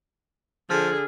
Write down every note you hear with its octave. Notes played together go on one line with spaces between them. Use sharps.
D3 F3 G#4 F6